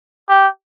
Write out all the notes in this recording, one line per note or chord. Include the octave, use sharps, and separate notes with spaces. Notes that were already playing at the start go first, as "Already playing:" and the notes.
G4